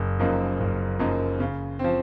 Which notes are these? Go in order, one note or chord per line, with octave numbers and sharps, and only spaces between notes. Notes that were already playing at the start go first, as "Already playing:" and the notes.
Already playing: F#1
F#2 F3 A#3 D#4
F#1
F#2 F3 A#3 D#4
C#3
F3 C4